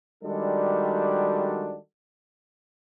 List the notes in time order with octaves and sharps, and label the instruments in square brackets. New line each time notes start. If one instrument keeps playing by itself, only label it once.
[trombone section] D#3 G3 G#3 D4 F#4 A4